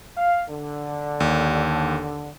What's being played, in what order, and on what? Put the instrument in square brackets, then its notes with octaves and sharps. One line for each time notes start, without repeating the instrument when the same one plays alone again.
[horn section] F5
D3
[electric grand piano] D#2